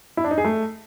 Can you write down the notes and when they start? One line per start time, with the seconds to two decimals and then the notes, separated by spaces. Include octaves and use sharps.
0.17 E4
0.24 D4
0.31 D#4
0.38 G#4
0.44 A3